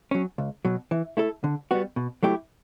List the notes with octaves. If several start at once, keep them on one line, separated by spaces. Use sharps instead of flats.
F#3 C#4
C#2
B2 F#3
E3
A3 E4 A4
D3
G3 B3 F#4
B2
F#3 A3 E4 G4